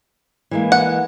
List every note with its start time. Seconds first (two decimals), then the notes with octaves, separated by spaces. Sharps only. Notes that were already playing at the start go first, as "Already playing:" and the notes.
0.51 E3 G#3 A#3
0.72 F#5